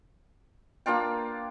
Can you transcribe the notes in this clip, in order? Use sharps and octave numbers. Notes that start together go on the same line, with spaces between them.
A#3 D4 F4 G5